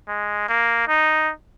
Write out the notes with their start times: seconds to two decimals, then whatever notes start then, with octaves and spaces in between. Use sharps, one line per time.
0.08 G#3
0.49 A#3
0.88 D#4